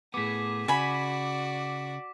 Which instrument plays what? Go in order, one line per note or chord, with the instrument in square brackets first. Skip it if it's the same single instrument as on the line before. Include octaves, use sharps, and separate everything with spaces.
[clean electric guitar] A2 B3 [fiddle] G#4 [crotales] D6 B6
[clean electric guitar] C#3 [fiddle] F#4 D5 [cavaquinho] G#5 B5